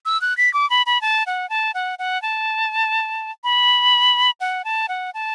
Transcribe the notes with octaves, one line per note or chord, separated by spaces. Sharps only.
E6
F#6
B6
D6
B5
B5
A5
F#5
A5
F#5
F#5
A5
B5
F#5
A5
F#5
A5